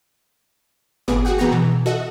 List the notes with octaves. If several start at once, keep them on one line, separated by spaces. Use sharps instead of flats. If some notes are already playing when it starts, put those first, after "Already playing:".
G1 A2 B3 G#4 D6
F#4 G#4 F#5 G5
E3 B3 G#4 G5 A#5 C#6
B2 E3
F#4 A4 D#5 E5 F#5